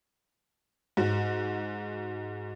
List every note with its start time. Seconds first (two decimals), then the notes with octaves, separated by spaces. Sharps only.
0.97 G#2 F#4